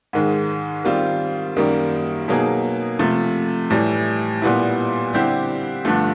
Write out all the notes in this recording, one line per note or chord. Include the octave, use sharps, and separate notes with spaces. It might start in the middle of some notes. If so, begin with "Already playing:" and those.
G#2 D#3 G#3
D#3 G3 C4 F4
F#2 D#3 G3 A#3
B2 F#3 A#3 D#4 G#4
C3 F3 A3
A2 E3 G3
A#2 G3 B3 E4
D3 G3 C4 E4 G4
G2 D3 F3 A3